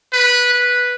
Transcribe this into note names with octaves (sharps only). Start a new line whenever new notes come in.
B4
B4